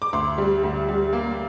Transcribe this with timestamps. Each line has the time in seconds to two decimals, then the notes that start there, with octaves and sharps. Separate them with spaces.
0.02 D6
0.13 D2 C6
0.38 G3
0.63 D2
0.88 G3
1.13 A#3